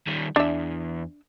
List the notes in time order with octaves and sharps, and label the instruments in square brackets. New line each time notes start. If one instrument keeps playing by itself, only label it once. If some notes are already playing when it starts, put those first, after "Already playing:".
[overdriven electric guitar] D#3 G3
[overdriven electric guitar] E2 [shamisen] D4 E5